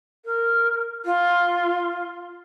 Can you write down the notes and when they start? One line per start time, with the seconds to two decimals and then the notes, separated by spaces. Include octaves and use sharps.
0.25 A#4
1.05 F4